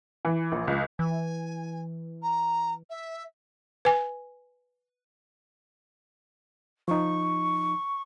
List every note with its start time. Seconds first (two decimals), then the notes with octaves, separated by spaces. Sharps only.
0.25 E3
0.52 A#1
0.67 C#2
0.99 E3 G#5
2.22 A#5
2.89 E5
3.85 B4 G#5
6.88 F3 D#4 C#6